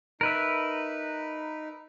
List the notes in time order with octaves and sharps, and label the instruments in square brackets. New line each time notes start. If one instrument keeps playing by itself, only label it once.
[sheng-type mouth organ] D#4 [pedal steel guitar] A#4 B4 E5